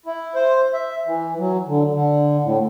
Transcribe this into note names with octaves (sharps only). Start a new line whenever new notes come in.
E4
C5
E5
E3
F#3
D3
D3
A2